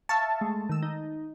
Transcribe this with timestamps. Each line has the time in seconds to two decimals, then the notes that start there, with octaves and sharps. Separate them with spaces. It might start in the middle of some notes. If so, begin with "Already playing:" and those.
0.09 E5 F5 A5 C#6
0.41 G#3 A3
0.69 D#3 E6
0.82 D#4